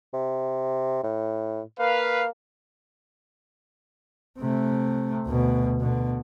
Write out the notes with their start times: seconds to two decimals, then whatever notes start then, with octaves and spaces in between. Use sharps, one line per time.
0.13 C3
1.03 A2
1.79 A#3 B4 F5
4.38 C3 A3
5.27 D2 B2
5.80 B2 D3